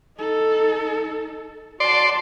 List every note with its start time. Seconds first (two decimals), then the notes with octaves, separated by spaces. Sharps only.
0.18 D#4 A4
1.80 F#4 D5 A5 C6